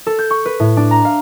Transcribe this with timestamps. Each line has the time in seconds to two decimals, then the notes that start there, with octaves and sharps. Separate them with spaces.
0.07 A4
0.19 G6
0.30 C#6
0.46 B4
0.60 A2
0.77 D4
0.91 A#5
1.05 F5